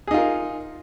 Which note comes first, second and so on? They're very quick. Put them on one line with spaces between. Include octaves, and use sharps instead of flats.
G#4 D#4 F4 A#4